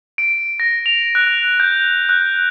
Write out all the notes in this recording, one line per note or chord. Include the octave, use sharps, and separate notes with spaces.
D7
A#6
F7
F#6
G6
F#6